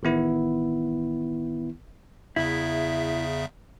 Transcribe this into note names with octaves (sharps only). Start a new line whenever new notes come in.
A1 D#3 B3 E4
E2 C#3 E4 E5